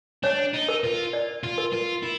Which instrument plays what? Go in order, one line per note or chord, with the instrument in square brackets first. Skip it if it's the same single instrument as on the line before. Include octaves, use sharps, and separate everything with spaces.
[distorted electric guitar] D4 [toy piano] C#5
[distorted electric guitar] D#4
[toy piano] A#4
[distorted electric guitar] F4
[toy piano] D5
[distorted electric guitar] F4
[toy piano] A#4
[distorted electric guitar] F4
E4